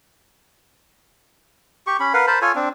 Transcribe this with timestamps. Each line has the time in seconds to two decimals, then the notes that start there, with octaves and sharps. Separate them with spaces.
1.87 G4 C#6
2.00 C#4 B5
2.14 A#4 B4 F5 F#5
2.27 A#4 C5 A5 B5
2.42 F4 A4 C#5 G#5
2.55 C4 D4